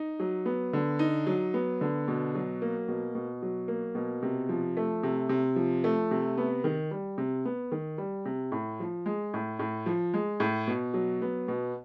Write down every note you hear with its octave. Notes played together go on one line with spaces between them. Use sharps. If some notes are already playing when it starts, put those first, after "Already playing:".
Already playing: D#4
F#3
B3
D3
D#4
F#3
B3
D3
B2
F#3
A#3
B2
B2
F#3
A#3
B2
C3
F3
A3
C3
C3
F3
A3
C3
B3
D#3
G3
C3
B3
D#3
G3
C3
A2
F3
G#3
A2
A2
F3
G#3
A2
B2
F#3
B3
B2